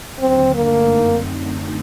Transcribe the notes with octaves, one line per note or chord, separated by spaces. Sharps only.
D#2 D3 F#3 C4
G2 D3 A3 A#3 D4
F#2 D3 A3 C4 D#4